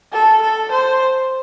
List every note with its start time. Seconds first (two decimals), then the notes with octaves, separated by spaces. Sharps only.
0.13 A4
0.42 A4
0.72 C5